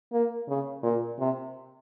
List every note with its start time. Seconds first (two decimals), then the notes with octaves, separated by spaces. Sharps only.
0.13 A#3
0.48 C#3
0.83 A#2
1.19 C3